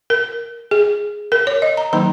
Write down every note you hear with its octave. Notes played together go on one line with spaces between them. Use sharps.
A#4
G#4
A#4
C#5
D#5
A#5
D#3 F#3 A#3 D#4 A#5